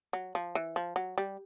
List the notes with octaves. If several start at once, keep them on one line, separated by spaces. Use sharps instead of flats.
F#3
F3
E3
F3
F#3
G3